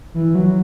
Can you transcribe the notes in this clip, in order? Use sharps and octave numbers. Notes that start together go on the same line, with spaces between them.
E3
F#3